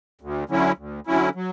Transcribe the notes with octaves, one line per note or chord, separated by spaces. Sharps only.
D2
D3 F#3 C#4 E4
D2
D3 F#3 C#4 E4
F#3